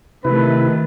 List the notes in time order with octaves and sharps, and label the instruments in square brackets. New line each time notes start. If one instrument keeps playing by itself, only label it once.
[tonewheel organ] C3 E4 [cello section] D#3 A3 [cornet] B4